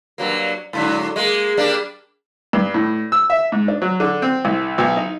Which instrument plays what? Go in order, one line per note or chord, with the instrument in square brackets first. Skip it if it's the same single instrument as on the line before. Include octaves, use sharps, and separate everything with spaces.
[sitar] G2 F#3 A#3
G#2 D3 F#3
G#3 A#3
G3 A#3 D4
[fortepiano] G2
A2
E6
E5
G#2
D4
F#3
D3
C4
C2
B1
D#4